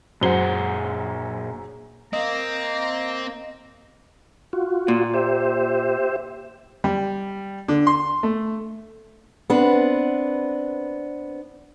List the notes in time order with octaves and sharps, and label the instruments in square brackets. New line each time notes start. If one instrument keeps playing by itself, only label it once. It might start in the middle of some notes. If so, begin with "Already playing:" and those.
[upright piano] F#2 C5 G7 [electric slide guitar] A#2 G#4 F#5
[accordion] A#3 [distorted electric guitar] C4 [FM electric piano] D#5 [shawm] A#5
[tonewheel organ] F4 F#4
[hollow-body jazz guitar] A#2
[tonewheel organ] G4 C5 E5
[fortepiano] G3
D3
C6
A3
[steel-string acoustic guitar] B3 C4 D4 B4